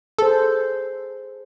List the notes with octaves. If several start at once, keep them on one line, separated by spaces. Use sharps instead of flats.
G#4 A4 C5